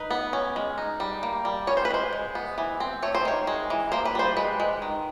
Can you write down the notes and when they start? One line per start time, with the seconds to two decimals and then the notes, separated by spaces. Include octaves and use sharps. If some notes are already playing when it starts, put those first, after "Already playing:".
Already playing: D#4 B4
0.11 B3
0.33 C#4
0.56 G#3
0.78 D#4
1.00 G3
1.23 A#3
1.45 G3
1.67 C#4 C#5
1.77 C5
1.85 B4
1.91 G#3 C5
2.13 G#3
2.35 B3
2.58 E3
2.80 C4
3.03 A3 C#5
3.15 C5
3.25 D#3 C#5
3.47 G#3
3.70 E3
3.92 A#3 C5
4.05 B4
4.15 G3 C5
4.37 G#3 B4
4.60 G#3
4.82 D#3